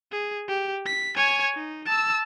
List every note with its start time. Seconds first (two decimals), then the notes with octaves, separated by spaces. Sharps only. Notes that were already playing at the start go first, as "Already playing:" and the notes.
0.11 G#4
0.48 G4
0.86 B6
1.16 C#5 G#5
1.55 D#4
1.86 A5 E6